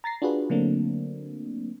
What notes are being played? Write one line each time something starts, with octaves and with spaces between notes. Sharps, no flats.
A#5 A6 A#6 C7
D4 F4 F#4 G#4 B4
D3 F#3 A3 A#3 C4 D4